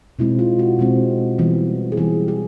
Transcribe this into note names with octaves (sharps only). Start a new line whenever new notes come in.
B2 G#3 C4 E4
F4
F#4
B2 G#3 C4
E3 G3 B3
G#4
E3 G3 B3 G4
G4